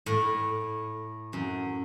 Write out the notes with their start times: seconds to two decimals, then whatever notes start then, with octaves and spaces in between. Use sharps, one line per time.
0.06 A2
1.33 F#2